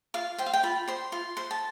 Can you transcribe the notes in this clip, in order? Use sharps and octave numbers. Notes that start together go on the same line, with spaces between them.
F4 F5
C5 G5
F5
G5
F4 B5
C5 C6
F4 C6
C5 C6
A5